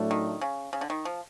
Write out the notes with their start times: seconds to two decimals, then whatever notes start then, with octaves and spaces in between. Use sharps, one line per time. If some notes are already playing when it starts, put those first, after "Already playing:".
Already playing: A2 F#3 A3 D4
0.11 D#3
0.41 C#3
0.73 C#3
0.81 D3
0.90 D#3
1.05 F3